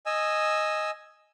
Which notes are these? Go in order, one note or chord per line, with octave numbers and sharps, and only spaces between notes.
D#5 G#5 E6